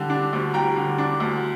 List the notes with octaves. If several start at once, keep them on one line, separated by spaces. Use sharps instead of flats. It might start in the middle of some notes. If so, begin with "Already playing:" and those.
Already playing: D3 G3 A5
D4
D2
G3 G5 A#5
D3
D4
D2